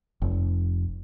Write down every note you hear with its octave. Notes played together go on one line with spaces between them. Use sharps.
F1